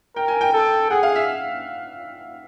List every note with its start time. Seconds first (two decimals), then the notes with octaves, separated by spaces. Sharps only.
0.16 A#4 G5
0.28 G#5
0.41 G5
0.53 A4
0.90 G#4 F#5
1.03 F5
1.15 E5